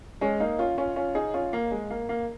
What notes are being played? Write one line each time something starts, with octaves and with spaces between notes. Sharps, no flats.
G#3 C#4
A#3 D#4
C#4 F4
C#4 F4
C#4 F4
D#4 G#4
C#4 F4
A#3
G#3
A#3
A#3